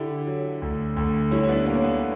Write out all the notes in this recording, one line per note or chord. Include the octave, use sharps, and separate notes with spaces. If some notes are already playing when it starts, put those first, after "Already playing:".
Already playing: D3 E4 G4
F#3
D2
D2
G3 C#4 E4
E4
B3 D4
A#2 A#3 C#4
B3